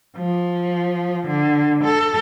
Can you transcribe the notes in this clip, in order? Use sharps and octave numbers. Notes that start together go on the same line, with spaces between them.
F3
D3
A4